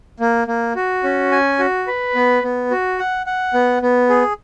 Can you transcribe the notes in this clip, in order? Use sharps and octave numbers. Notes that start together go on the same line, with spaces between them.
A#3
A#3
F#4
C#4
G#5
F#4
B4
B3
B3
F#4
F#5
F#5
B3
B3
G#4